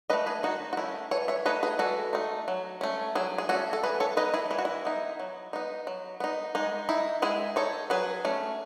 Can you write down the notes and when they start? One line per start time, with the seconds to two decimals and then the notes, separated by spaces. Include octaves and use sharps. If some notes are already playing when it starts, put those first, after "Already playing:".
0.10 C#4 B4 D#5
0.13 A3
0.26 G#4 B4
0.43 D#3 D#4 F#4
0.73 F#4
0.77 A3 C#4 E4
1.11 E3 A4 C#5
1.28 C#5 E5
1.46 A3 D#4 B4 D#5
1.63 G#4 B4
1.79 E3 F#4 A4
2.13 A3 D#4
2.48 F#3
2.81 A3 C#4
3.15 F#3 E4 G#4
3.38 G#4
3.49 A3 C#4 F#4 A4
3.73 A4
3.83 E3 G#4 B4
4.00 A4 C#5
4.17 B3 D#4 B4 D#5
4.34 E4 G#4
4.51 E3 E4
4.59 F#4
4.65 E4
4.85 B3 D#4
5.20 F#3
5.53 B3 D#4
5.87 F#3
6.20 B3 D#4
6.55 G#3 D#4
6.89 D#4 E4
7.22 G#3 E4 G#4
7.56 D#4 A4 C#5
7.90 F#3 G#4 B4
8.25 A3 C#4